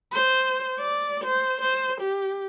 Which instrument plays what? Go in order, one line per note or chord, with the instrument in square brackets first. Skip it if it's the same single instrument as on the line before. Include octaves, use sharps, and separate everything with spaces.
[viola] C5
D5
C5
C5
G4